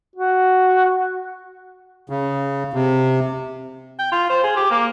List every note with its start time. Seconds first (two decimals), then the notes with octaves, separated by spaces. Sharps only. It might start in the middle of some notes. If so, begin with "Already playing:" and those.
0.16 F#4
2.10 C#3
2.73 C3
3.99 G5
4.12 F4
4.30 C5
4.44 G#4
4.57 G4
4.71 A#3